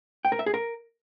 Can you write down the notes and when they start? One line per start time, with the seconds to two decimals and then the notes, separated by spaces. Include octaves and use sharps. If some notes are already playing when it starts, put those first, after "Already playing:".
0.25 G5
0.32 A#4
0.39 E5
0.46 G#4
0.54 A#4